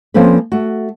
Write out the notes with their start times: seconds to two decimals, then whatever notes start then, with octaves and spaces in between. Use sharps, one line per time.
0.14 F3 A#3 C4 C#4 A4 B4
0.52 A3 F#4